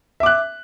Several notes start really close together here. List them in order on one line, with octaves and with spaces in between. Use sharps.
E5 D6 F#6